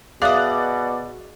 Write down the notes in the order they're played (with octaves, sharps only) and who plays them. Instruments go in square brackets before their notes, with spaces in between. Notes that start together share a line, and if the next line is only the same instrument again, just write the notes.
[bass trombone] B2 [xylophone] G#4 E5 D#6 [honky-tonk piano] D5 F#6 [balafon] F5